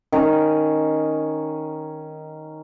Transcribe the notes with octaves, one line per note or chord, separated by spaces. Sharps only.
D#3 C#4